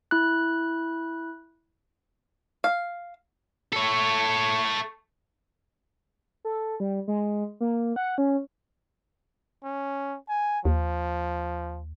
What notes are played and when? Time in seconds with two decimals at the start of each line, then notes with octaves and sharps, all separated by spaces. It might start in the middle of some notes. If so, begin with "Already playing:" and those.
0.11 E4 F#6
2.64 F5
3.72 A4 C#5
6.45 A4
6.80 G3
7.08 G#3
7.60 A#3
7.96 F#5
8.18 C#4
9.63 C#4
10.29 G#5
10.65 D#2 F3